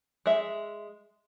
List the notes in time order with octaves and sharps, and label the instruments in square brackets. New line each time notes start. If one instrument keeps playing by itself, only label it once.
[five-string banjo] G#3 E5